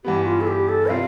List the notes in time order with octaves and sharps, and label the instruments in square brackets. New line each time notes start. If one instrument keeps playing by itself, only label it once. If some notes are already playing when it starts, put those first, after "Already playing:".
[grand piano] G2 E3 B3 [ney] G4
[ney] F4
A4
G4
A4
[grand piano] C3 G3 C4 F4 [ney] F5